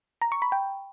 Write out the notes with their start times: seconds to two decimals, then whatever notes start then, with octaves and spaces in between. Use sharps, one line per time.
0.22 A#5
0.32 C#6
0.42 B5
0.52 G5